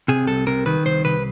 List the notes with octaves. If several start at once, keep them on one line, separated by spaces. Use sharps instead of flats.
C3 G#4
C2 A4
C3 A#4
D#3 B4
C2 C5
C2 B4